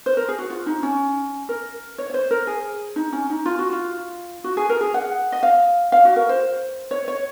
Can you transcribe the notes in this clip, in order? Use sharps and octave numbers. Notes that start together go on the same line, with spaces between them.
C5
A#4
G#4
F#4
F4
D#4
C#4
A#4
C#5
C#5
C5
A#4
G#4
D#4
C#4
D#4
F4
F#4
F4
F#4
G#4
A#4
G#4
F#5
D#5
F5
F5
F#4
A#4
C5
C#5
C#5